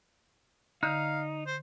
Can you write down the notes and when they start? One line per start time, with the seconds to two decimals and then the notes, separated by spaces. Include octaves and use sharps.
0.83 D3 D#4 F5 G6
1.46 C5